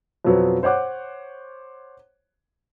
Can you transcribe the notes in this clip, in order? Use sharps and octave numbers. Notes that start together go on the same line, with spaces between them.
F2 B2 F#3 B3 C4
C5 C#5 F#5 D6 F#6